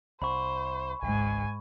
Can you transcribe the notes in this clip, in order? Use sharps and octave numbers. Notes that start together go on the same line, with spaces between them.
C2 C5 B5 C#6
G#1 C#2 G#2 G#5